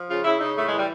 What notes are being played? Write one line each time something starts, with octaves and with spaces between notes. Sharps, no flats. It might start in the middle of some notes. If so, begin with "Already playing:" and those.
Already playing: F3
C#3 F4
C#3 E4
C#3 D#4
A2 A3
G#3
E3
G3